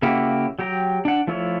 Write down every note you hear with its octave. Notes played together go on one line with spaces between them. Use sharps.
C#3 A#3 E4 F#4 G4
F#3 G4 G5 A#5
D4 F#5
F3 A3 E4 F4 C#5